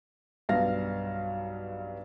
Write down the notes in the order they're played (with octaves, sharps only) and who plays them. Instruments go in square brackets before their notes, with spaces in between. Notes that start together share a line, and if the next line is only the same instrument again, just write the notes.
[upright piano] B1 G2 B3 F5 A#6